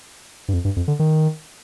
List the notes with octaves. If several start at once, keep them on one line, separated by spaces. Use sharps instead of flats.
G2
F2
G2
F2
D3
D#3